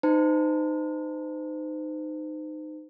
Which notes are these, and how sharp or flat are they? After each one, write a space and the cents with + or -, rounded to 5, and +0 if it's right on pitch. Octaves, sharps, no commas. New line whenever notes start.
D#4 -15 C5 -35 A5 +45